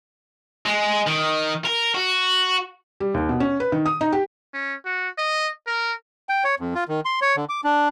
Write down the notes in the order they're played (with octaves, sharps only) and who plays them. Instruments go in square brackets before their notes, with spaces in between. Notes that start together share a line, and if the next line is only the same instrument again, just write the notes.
[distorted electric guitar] G#3
D#3
A#4
F#4
[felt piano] G3
D#2
B2
C#4
B4
D#3
D#6
D#4
G4
[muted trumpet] C#4
F#4
D#5
A#4
[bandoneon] G5
C#5
F2
F4
D#3
C6
C#5
D3
D6
D4